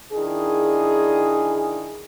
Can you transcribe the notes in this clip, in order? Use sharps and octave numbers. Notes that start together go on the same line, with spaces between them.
D#3 D4 E4 G#4